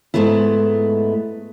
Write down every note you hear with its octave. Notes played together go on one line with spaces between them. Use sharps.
G#2 E3 G#3 A3 B3 E4